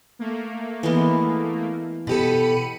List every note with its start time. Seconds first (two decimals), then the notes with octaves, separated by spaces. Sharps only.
0.19 A3 A#3
0.83 E3 G#3 B3
2.07 B2 G4 A4 B5 C#7 D#7